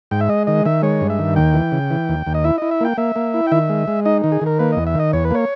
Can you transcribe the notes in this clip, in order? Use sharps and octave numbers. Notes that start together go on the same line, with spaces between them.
G#2 G5
E5
G#3 D#5
D#3 D#5
D#3 E5
G#3 C#5
G2
E5
D#3
D#2 G5
E3
C#3
E3
D#2
D#2
D#5
E4 E5
E4 D#5
E5
A#3 G5
A#3 E5
A#3
E4
G5
D#3 E5
G#3
G#3
D#4 D#5
D#3
G#4
D#3 A#4
A#3 B4
E2 D#5
E5
D#3 D#5
E2 C#5
B4
A#3 C#5